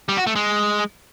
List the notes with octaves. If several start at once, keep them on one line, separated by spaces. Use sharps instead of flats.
G3
F#4
A3
G#3